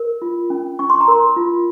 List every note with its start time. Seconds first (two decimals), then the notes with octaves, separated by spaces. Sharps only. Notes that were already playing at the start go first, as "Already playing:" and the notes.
Already playing: A#4
0.22 F4
0.50 C#4
0.79 C#4 C#6
0.90 C6
1.01 A#5
1.08 A#4 C6
1.36 F4